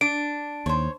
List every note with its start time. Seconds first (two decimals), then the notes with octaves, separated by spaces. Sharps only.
0.01 D4 D7
0.66 D#2 C5 C#5